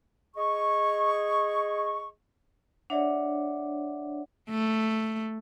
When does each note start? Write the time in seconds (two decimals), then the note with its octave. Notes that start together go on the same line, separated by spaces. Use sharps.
0.35 G#4 D#5 C#6
2.90 D4 C#5 D5 E5 F#5
4.50 A3